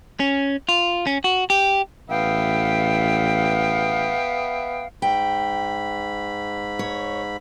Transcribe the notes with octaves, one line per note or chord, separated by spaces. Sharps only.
C#4
F4
C#4
F#4
G4
A1 B3 E5 F5 G5
G#2 G5 B5
C#5